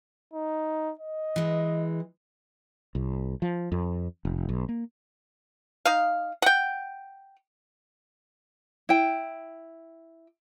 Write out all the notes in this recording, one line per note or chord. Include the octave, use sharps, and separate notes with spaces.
D#4
D#5
E3 G#3
C2
F3
F2
F1
B1
A#3
D#4 F5
F#5 G5
E4 G5